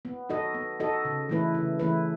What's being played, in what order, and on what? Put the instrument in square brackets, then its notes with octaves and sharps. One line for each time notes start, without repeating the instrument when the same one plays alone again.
[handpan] B3
D#4 F#4 A4 D#5
B3
D#4 F#4 A4 D#5
C#3
E3 A3 E4 B4
C#3
E3 A3 E4 B4